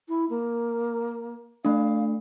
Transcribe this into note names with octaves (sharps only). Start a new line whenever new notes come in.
E4
A#3
A3 D4 F5